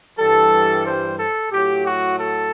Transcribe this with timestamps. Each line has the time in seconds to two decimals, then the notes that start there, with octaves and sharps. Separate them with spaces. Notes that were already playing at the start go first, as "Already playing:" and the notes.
0.18 G2 E3 G3 A4
0.85 C5
1.19 A4
1.52 A2 F#3 G4
1.85 F#4
2.18 A4